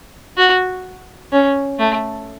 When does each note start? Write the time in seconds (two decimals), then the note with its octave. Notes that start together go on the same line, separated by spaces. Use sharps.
0.37 F#4
1.32 C#4
1.79 A3